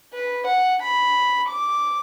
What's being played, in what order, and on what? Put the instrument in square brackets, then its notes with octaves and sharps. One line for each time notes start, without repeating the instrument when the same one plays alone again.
[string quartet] B4
F#5
B5
D6